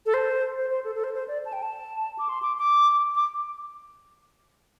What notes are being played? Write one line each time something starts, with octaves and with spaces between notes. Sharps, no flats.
A4
C5
C5
C5
A4
A4
C5
C5
D5
A5
G5
A5
D6
C6
D6
D6
D6